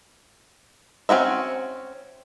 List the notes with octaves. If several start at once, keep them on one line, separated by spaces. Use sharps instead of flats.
C4 C#4 F#4 E5